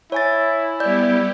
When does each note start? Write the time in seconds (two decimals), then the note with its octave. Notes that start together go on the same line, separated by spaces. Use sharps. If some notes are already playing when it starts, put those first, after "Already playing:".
0.12 E4 C#5 G#5 A6
0.80 G3 B3 G4 D5 G6